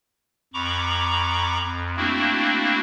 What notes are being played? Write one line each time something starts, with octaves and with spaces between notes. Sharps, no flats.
F2 A#5 B5 C#6 D6
F2
A3 A#3 C4 D4 E4 F#4